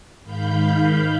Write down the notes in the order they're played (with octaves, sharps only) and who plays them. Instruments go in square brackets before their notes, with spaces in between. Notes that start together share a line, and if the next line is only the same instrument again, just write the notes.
[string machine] G#2 D#3 F5 B5 G6